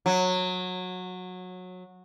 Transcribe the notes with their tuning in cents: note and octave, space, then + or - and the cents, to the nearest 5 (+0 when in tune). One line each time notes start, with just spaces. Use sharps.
F#3 -20